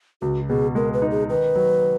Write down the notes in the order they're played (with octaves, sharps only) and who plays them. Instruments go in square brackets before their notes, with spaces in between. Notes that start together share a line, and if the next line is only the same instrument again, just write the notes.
[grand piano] C#2 [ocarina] F#4
[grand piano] B2 [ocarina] G#4
[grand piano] G#3 [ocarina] A#4
[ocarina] B4
[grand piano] D#4
[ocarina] G#4
[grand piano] D#3 [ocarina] B4
[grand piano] F#3